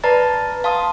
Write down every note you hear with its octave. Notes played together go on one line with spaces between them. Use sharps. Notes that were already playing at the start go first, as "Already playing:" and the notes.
B4 D5 A5 A#5 A6
F5 A5 C6 D#6